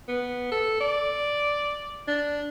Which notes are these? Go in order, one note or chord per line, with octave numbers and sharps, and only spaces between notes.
B3
A4
D5
D4